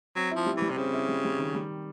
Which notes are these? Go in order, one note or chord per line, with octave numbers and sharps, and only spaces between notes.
F#3 C4
E4
F3
G3
E3 G3
C3
C#3 C4
E4
G3
G3
D#3
G3